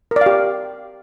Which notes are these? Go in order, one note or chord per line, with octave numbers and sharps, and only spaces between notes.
A#4
D5
F5
G4